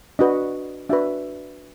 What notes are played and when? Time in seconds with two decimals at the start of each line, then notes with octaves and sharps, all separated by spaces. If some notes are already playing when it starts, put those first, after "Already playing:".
0.19 D4 F#4 B4 D#5
0.89 D4 F#4 B4 E5